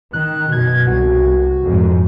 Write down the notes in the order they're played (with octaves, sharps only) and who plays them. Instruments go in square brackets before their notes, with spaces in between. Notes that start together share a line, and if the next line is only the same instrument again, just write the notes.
[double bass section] D#3 [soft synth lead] F#6
[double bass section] F#2 B2 [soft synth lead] G#6
[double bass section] C2 [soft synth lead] F#4
[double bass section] F2 G#2